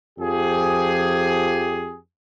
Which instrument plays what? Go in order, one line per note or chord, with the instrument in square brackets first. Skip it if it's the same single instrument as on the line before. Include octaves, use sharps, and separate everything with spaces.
[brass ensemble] F2 F3 G4 G#4